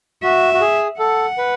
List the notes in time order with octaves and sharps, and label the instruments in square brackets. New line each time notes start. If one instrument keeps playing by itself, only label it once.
[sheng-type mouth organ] F#4 [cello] E5
[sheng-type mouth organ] F#4
G#4
[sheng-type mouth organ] A4 [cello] F#5
[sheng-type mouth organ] B4